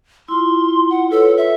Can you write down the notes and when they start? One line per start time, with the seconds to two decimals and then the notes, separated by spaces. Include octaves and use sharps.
0.28 E4 F4 C6
0.90 F#5
1.11 F4 A4 B4 C#5
1.37 E5